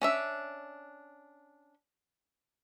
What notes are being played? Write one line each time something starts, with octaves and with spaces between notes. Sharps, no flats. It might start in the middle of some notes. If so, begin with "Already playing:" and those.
C#4 D4 E5